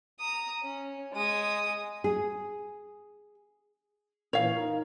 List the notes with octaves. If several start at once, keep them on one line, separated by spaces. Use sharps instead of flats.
A#5 D#6
C#4
G#3 D#6
G#4
A#2 E3 A#3 C#5 F5
D#4 A#4